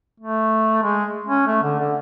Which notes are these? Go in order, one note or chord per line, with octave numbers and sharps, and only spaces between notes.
A3
G#3
C#4
A3
D3
D3